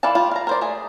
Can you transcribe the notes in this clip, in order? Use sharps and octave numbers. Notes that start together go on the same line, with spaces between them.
E3 A4 D5 F5 A5
G3 F4
F5 A#5
A#4 C5 D5
A3 G#4